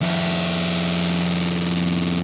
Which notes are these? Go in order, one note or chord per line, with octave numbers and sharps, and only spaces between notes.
F2 E4